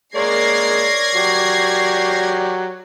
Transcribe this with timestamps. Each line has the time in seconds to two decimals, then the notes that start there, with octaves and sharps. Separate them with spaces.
0.16 G#3 A#3 A#4 C#5 D5 G#6 A#6 C7
1.14 F#3 G4